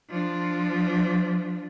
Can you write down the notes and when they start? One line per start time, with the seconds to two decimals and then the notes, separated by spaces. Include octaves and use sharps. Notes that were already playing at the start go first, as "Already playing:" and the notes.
0.10 F3 D4